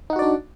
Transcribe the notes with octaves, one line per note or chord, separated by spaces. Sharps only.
D4 D#4 F#4 D5 F#5